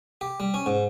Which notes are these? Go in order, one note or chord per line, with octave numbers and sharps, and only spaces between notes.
G4
G3
C#4
G#2